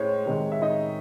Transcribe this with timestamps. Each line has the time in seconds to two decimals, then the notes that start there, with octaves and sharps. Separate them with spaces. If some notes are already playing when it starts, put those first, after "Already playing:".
Already playing: A2 G#3 C5 C#5
0.26 C3 D#3 G#3
0.52 E5
0.62 D#4 D#5